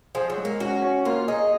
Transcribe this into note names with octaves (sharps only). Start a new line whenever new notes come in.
F3 G#4
F#3
G#3
A#3
C#4 F#4
C#4
A#3 F4
D#4 G#4